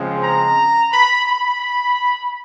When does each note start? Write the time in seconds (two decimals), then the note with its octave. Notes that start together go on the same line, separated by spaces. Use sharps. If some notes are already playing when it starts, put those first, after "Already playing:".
Already playing: C#3 F3 G#3 C4
0.22 A#5
0.92 B5
1.26 B5